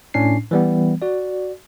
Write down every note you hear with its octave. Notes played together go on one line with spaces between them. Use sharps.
A2 C#4 D4 C7
E3 G3 B3
F#4 D5